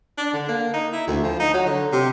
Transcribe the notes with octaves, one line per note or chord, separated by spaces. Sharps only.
D4
D3
A#3
D#4
E4
D2
F3
D#4
F#3
D3
C3